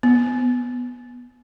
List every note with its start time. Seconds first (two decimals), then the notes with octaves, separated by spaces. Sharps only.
0.03 B3